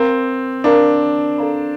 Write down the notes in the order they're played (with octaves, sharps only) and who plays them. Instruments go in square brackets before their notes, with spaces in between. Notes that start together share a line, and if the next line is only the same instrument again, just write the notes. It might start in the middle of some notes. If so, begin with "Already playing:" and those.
Already playing: [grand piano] C4 [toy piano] A#4 F5 A#5
[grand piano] D4 [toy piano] A#4 F5 A#5
[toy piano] A4 D5 F5 A#5